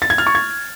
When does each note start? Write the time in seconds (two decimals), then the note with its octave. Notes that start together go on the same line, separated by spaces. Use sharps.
0.02 A6
0.10 G#6
0.18 F6
0.27 C#6
0.35 G#6